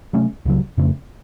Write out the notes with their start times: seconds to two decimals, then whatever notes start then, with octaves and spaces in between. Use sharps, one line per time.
0.13 C3 F#3 A3 C#4
0.45 C#2 C#3 F#3
0.78 F2 C#3 A3 C4